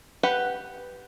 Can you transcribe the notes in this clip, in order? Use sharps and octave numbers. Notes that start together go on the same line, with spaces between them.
G4 B4 F#5